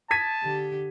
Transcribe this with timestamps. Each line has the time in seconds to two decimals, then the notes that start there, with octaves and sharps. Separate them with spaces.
0.11 A5 G#6 B6 D#7
0.43 D3 G4